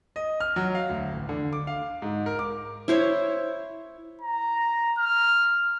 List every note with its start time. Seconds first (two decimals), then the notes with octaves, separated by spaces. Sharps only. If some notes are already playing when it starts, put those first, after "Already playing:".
0.16 D#5
0.40 F6
0.56 F#3
0.75 F5
0.90 D2
1.13 A1
1.29 D3
1.53 D6
1.67 F5
2.02 G#2
2.26 A#4
2.39 D6
2.88 E4 C5 C#5
4.21 A#5
4.98 F6